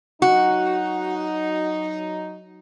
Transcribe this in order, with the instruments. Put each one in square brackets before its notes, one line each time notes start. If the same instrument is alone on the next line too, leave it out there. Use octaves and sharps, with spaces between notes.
[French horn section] F#3 D#4 [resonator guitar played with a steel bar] F#4